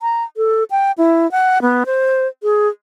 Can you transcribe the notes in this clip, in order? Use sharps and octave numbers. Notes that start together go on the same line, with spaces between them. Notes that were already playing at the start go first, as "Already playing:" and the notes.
A#5
A4
G5
E4
F#5
B3
C5
G#4